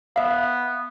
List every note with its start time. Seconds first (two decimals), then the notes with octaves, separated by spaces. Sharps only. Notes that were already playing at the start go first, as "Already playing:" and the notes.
0.16 B3 E5 F5